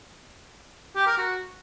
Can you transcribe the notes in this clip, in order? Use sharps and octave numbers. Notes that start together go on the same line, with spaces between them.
G4
A#4
F#4